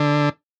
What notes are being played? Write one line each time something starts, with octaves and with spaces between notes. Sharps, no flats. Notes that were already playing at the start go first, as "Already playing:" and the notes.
Already playing: D3